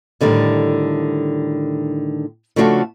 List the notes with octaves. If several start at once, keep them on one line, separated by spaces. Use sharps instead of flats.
A2 D3 D#3 G3
C#3 F3 A3 D4 F#4 A4